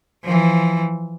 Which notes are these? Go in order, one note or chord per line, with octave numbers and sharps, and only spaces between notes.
E3 F3